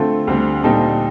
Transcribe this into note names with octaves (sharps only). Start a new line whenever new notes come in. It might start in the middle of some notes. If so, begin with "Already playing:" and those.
Already playing: D3 A3 C4 F4 A4
D2 D3 G3 C4
A#2 G3 C4 D#4 A4